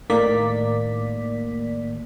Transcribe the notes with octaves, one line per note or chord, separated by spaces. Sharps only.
A2 D#3 A#3 D5 B6